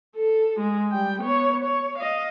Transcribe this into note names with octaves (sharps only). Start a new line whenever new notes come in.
A4
G#3
G3 G5
B3 C#5
C#5
D#5 F5